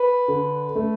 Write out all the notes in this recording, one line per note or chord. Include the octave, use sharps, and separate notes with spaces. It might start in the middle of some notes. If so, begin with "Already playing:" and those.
Already playing: B4
D3
A3